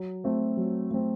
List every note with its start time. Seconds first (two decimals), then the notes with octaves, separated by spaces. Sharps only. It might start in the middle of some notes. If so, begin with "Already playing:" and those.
Already playing: F#3
0.24 A3 C4
0.57 F#3
0.91 A3 C4